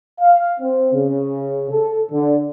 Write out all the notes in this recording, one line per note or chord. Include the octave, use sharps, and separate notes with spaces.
F5
C4
C#3
A4
D3